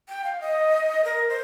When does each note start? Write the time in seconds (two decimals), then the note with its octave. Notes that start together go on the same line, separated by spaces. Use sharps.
0.09 G5
0.24 F5
0.41 D#5
1.05 A#4
1.29 C5